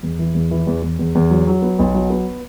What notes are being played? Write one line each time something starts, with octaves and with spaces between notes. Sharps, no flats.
E2
E3
E2
E3
E2
E2
E2
E2
F#3
F#3
B3
B1
F#3
B3